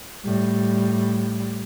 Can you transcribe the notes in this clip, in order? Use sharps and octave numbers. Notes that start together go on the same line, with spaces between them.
A2 G3